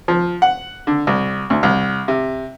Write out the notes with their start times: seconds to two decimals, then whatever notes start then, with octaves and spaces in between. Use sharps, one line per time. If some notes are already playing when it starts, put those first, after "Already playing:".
0.08 F3
0.42 F#5
0.87 D3
1.07 C2
1.50 D2
1.63 C2
2.08 C3